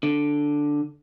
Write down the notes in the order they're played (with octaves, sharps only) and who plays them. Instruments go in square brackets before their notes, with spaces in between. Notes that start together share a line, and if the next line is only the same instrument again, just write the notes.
[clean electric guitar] D3